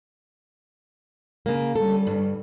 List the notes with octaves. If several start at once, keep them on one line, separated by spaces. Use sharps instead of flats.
C#3 A#3
D3 G3 C#4 A4
G2